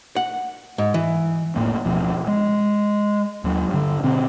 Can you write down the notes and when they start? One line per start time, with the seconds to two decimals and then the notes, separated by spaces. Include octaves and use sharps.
0.16 F#5
0.78 G#2
0.94 E3
1.56 F1 A2 A#3
1.85 D1 B2 F3
2.27 G#3
3.44 D#2 F#3
3.69 G2 D3
4.03 B2 D3 C4